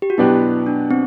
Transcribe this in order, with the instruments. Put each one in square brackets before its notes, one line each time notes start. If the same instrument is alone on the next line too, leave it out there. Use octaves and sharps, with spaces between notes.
[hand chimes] G4
F#4
[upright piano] B2 F#3 B3 D4 G4 [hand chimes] E4
[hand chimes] D4
C4